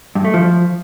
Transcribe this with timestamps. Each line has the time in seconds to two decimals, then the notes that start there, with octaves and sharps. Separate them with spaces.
0.15 G2
0.25 A3
0.34 F3